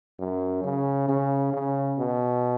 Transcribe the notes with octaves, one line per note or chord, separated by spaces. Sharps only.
F#2
C#3
C#3
C#3
B2